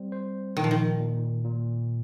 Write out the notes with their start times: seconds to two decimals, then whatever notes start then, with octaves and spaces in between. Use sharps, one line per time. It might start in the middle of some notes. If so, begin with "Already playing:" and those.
Already playing: G3 C4 C5
0.12 C5
0.57 A#2 D#3
0.64 F3
0.71 D#3
1.00 A#2
1.44 A#2